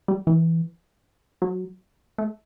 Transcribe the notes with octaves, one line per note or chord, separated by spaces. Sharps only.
G3
E3
F#3
A3